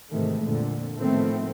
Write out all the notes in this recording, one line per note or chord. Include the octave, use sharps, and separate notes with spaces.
G#2 C3 D#3 E3 G#3 A3
F2 A#2 D3
A2 D#3 F3 A3 B3 C4